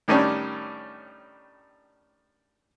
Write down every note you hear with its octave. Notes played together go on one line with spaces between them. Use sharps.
A2 D#3 G3 C#4 D4